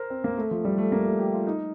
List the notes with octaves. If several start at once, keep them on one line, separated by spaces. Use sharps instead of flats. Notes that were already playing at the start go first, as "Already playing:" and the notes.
Already playing: A#4 C5
C4
A#3
A3
F3
G3
A3
A#3
A3
G4
F4
D#4